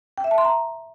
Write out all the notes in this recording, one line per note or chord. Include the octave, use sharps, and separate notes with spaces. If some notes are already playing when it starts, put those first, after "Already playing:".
G5
E5
A5
C6
A#5